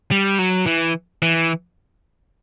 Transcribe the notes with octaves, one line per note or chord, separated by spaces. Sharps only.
G3
F#3
E3
E3